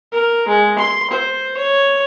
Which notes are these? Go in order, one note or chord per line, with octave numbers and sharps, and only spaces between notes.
A#4
G#3
C6
C5
C#5